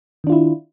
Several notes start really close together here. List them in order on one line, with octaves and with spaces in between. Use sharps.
D#3 D4 F4 E4